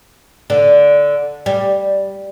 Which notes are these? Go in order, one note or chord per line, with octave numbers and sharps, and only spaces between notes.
D3
G3